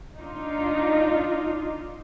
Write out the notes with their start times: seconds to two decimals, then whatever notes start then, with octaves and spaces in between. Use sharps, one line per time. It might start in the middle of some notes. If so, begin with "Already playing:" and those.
0.18 D4 D#4 F4